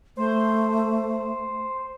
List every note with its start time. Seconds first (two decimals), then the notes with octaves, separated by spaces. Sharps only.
0.17 A3 C5